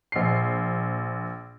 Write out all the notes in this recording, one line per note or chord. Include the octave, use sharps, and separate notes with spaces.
A#1 C7